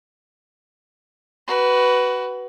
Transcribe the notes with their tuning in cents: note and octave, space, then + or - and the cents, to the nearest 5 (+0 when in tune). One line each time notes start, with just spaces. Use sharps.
F#4 +20 B4 +0